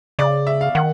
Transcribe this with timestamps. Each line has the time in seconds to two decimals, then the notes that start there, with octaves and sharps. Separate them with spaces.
0.19 C#3 D5
0.47 E5
0.61 F5
0.75 D#3 F#5